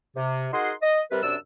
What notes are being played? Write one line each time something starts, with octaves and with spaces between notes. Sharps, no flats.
C3
D#4 F#4 G#4 A#4 F#5 C6
D#5
C3 G3 A#4 B4
F#2 C3 D4 D5 E6